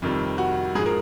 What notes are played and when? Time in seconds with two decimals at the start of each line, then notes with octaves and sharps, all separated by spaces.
0.02 F2 C3 D#3 G3
0.38 F#4
0.75 G#2 G#4
0.79 F3
0.86 A#4